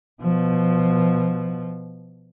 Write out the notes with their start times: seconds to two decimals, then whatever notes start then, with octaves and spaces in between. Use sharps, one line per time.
0.22 B2 F3